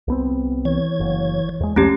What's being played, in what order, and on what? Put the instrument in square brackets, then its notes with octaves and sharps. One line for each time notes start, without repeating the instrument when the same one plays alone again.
[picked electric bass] C2 B3 C4
[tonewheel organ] E3 C#5 G#6
[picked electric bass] F#1
E2 G#3
[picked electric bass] C2 F2 F3 [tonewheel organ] G#3 [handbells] A3 C#4 G4